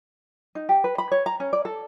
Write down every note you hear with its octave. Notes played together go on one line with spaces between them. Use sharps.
D#4
G4
B4
B5
C#5
A#5
C#4
D5
A4